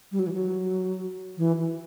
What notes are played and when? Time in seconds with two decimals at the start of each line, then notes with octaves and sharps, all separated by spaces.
0.12 G3
0.19 F#3
0.27 E3
0.33 F#3
1.38 E3
1.58 E3